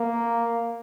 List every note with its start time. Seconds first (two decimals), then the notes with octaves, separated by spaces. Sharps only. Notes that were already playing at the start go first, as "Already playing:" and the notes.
Already playing: A#3